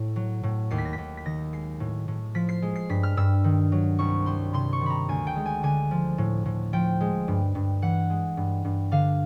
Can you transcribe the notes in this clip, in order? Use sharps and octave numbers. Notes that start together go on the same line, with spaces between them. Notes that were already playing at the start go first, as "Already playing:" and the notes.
Already playing: A2
F#3
A2
D#2 C7
B6
A#6
B6
D#2
B6
D#3 A#6
G#3 C7
A2
A2
F3 B6
C7
G#3
C7
G2 B6
F6
G2 E6
D#3
F#3
C2 C#6
G3 C6
C3 C6
C#6
D#3
A#5 B5
D2 G#5
G5
G#3
G#5
D3 G#5
F3
A2
A2
F3 G5
G#3
G2
G2
E3 F#5
G#3
G2
G2
D3 F5